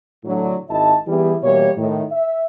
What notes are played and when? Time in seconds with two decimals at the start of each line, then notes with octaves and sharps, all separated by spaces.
0.24 A2 D3 F#3
0.69 G#1 E4 D#5 A5
1.06 E3 G3 B3 E4 G4 G#4
1.42 B2 E3 G3 A#3 C#5
1.77 A2 D#3
2.10 E5